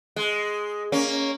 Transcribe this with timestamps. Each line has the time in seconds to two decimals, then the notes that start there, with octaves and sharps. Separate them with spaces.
0.16 G#3
0.92 A#3 C#4